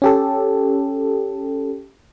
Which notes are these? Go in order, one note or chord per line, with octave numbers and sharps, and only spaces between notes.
C#4 G4 A4